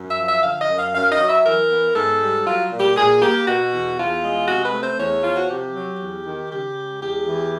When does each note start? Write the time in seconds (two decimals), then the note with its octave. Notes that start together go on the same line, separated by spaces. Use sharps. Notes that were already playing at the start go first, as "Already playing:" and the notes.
Already playing: F#2
0.11 E5
0.19 F3
0.27 E5
0.44 D3 F5
0.61 D#5
0.69 F#2
0.78 F5
0.94 F#2 F5
1.11 D#5
1.20 F#3
1.29 E5
1.45 E3 A#4
1.70 B3
1.95 G#2 A4
2.21 G3
2.47 F#3 F4
2.72 A#2
2.80 G4
2.96 A#2 G#4
3.22 A#3 G4
3.47 B2 F#4
3.73 E2
3.98 E2 F4
4.23 G#3
4.48 C3 F#4
4.65 B4
4.74 A3
4.82 C5
4.99 E2 C#5
5.23 F3 F4
5.36 F#4
5.50 C3 G4
5.75 F#3
6.00 E2
6.26 D#3
6.50 C#3 G4
6.76 G#3
7.01 E2 G4
7.27 E3